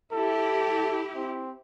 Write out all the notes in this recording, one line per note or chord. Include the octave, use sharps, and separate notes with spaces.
E4 G4 A4
C4